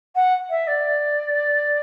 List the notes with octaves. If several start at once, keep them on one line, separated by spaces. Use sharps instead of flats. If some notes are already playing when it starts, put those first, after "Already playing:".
F#5
E5
D5